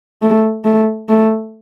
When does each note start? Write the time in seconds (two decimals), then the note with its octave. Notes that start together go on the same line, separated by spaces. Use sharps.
0.22 A3
0.65 A3
1.09 A3